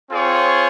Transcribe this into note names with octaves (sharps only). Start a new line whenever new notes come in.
C4 F4 G#4 C#5